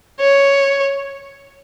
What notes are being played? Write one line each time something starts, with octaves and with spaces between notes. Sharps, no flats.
C#5